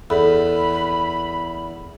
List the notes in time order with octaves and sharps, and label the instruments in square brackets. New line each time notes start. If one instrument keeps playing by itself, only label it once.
[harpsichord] E2 [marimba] A4 [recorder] B5